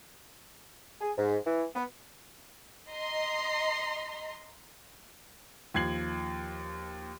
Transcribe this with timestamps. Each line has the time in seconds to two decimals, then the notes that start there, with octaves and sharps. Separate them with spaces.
1.01 G#4
1.17 G#2
1.47 E3
1.75 B3
2.91 D#5 A#5 C6
5.75 D#2 F3 G#6 C7 F#7